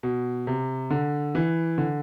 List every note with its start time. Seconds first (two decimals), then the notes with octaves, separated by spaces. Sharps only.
0.03 B2
0.47 C3
0.90 D3
1.35 E3
1.78 D3